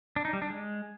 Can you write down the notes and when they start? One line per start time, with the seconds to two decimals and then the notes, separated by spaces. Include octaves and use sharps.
0.16 D4
0.25 D#4
0.33 G3
0.42 D4
0.50 G#3